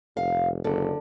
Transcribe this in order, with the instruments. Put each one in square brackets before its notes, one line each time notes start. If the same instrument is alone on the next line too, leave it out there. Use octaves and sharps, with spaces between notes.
[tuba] F1 [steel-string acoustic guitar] F5
[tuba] F#1 [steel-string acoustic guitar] D3